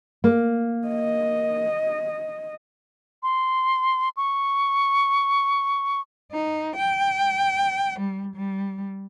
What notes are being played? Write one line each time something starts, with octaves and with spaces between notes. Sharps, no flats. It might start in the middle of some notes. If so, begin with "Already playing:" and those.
A#3
D#5
C6
C#6
D#4
G5
G3
G3